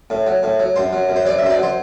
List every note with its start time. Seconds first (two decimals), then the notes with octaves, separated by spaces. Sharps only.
0.10 A2
0.27 F#3
0.43 A2
0.60 F#3
0.76 F#2 C5
0.93 F#3
1.09 F#2
1.16 C5
1.25 F#3 D5
1.39 E5
1.43 F#2 C5
1.50 D5
1.59 F#3 C5